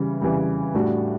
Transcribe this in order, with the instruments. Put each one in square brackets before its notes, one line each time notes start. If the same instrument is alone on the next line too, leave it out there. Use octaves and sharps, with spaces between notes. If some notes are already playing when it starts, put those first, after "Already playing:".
Already playing: [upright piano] C#3 E3 G3
C#3 E3 G3
A2 G3 D4 F#4